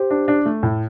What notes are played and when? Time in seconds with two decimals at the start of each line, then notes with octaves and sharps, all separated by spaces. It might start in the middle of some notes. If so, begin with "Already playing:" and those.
Already playing: G4 C5
0.11 D4
0.28 D4
0.46 A3
0.63 A2